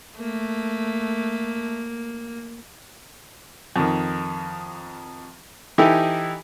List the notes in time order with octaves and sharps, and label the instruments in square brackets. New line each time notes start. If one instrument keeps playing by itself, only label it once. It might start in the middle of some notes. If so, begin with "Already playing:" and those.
[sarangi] A3 [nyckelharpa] A#3
[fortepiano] F2 D#3
E3 D#4 E4 G4 A4